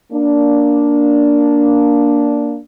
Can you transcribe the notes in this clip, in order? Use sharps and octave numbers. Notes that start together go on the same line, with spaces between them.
A#3 D4